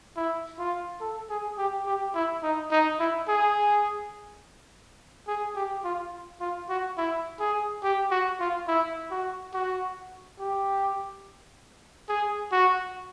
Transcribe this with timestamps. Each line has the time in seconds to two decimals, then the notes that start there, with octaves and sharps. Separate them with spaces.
0.16 E4
0.59 F4
1.00 A4
1.30 G#4
1.58 G4
1.86 G4
2.15 E4
2.43 D#4
2.71 D#4
2.99 E4
3.28 G#4
5.28 G#4
5.56 G4
5.84 F4
6.40 F4
6.69 F#4
6.97 E4
7.40 G#4
7.83 G4
8.11 F#4
8.40 F4
8.68 E4
9.11 F#4
9.54 F#4
10.39 G4
12.09 G#4
12.52 F#4